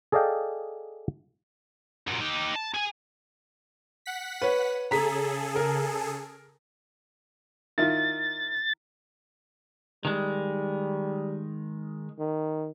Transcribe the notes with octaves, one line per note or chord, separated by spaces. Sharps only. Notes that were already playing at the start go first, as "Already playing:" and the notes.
G#4 A4 D5 D#5 F5 G5
F#2 A#2
D#4 G4
A5
G#4 G#5
F#5 B6
B4 C#5
C#3 G#4 A4 A#5 B6
A#4
D#3 E4 F4 A6
D#3 G3 G#3
D#3